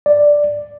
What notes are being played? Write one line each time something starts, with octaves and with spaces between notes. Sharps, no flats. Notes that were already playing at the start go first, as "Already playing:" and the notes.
D5